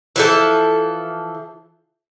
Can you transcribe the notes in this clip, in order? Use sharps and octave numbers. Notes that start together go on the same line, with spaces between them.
E3 F3 A4